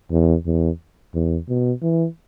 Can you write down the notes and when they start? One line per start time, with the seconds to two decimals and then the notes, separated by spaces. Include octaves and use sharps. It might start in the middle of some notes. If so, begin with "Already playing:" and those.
0.11 E2
0.46 E2
1.14 E2
1.48 B2
1.82 E3